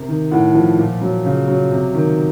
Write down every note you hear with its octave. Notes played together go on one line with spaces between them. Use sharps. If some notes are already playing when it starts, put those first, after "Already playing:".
Already playing: C3 A#4
D#3
A2 F#5
F3
A#2
F#3
C#3
F#3
C3
D#3